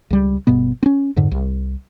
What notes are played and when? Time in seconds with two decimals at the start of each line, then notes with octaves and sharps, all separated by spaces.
0.10 C#2 G3
0.47 G1 G2 B2 B3
0.83 C4 C#4
1.16 F2 G#2 D3
1.31 C2